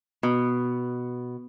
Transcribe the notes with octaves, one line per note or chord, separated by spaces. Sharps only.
B2